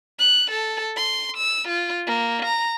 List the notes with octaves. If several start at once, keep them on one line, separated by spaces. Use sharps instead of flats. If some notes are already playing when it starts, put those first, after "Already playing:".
F#6
A4
C6
E6
F4
A#3
A#5